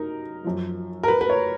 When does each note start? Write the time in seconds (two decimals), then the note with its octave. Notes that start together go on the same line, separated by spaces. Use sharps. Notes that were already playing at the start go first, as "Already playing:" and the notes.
Already playing: F#2 D#4 A#4
0.44 F#2 F3
1.03 A#4
1.08 B4
1.21 B4
1.30 C#5